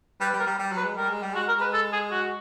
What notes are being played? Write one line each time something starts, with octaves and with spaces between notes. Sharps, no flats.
G3 B4
G3 B4
A#4
G3
G3
F#3
B4
G#3
G3 A#4
G#3
G3
G#3 F#4
A#4
G#3 B4
A4
G#4
F#4